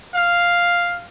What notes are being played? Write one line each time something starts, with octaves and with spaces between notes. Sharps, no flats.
F5